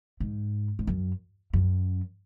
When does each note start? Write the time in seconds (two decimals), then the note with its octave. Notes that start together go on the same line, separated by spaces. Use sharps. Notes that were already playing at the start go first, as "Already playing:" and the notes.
0.20 G#2
0.79 G#2
0.87 F#2
1.53 F#2